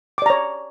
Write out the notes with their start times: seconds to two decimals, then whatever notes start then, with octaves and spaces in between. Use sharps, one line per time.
0.18 D6
0.22 D5
0.26 A#5
0.30 C#5